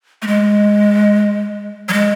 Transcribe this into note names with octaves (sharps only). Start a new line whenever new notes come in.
A3
G#3
F#3
G#3